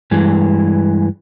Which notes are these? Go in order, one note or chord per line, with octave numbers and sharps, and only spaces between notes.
G2 E3 G#3